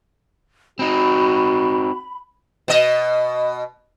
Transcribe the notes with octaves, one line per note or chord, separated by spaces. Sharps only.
C4 D#4 F#4 B5
B2 D#5